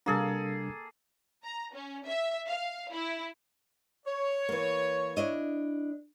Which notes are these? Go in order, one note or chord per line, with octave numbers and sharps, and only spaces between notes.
C3 G3 A#3 D4 G#4 A4
A#5
C#4
E5
F5
E4
C#5
E3 A#3
D4 E4 D#5